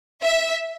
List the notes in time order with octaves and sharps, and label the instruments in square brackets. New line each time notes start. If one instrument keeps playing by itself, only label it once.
[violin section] E5